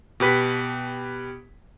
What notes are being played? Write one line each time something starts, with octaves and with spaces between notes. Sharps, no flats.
B2 G4 B4 B6